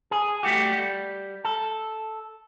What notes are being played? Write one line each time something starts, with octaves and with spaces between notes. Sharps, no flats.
G#4
G3 A3 F#4 G4
G3
A4